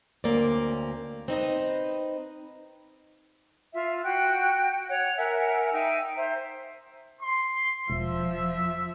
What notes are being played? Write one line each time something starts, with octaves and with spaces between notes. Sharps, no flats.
D2 A#3 C4 C#4 D5
C4 D#4 B4 D#5
F4 E5
F#4 G5 F#6
C#5 F#5 F#6
A#4 E5 F#5 G#5
D#4 E5 G5
C5 E5 A#5
C6
E1 F3 E5